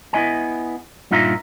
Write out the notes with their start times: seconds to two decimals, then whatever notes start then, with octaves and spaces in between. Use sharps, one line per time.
0.13 B3 E4 D#5 G#5
1.11 G2 A#2 D#4 F4 E5 A#5